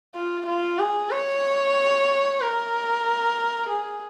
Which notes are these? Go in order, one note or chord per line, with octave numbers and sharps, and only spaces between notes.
F4
F4
G#4
C#5
A#4
G#4